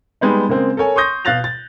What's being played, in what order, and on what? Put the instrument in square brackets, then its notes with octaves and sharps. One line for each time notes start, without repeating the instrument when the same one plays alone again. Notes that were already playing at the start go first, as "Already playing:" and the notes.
[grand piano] G3 G#3 B3 D#4
C#3 G#3 A#3 C4
A4 A#4 C#5 G#5
C6 C#6 D#6 G6 A#6
B2 F5 F#6 A6 A#6 F7
A6